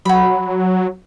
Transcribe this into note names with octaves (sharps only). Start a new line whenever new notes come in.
F#3 F#5 B5